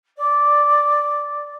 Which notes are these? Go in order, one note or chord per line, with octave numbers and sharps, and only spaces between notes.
D5